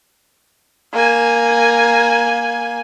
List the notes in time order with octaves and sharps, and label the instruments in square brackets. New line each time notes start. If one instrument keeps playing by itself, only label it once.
[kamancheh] A#3 G#5